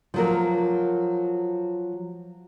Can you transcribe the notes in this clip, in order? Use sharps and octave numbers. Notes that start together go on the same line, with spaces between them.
F3 F#3 A#4